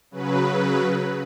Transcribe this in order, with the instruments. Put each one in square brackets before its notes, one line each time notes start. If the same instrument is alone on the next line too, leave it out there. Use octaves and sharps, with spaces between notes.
[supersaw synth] C#3 F#3 B4